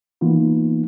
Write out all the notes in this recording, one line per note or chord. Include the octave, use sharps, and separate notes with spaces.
E3 A#3 B3 D#4 F4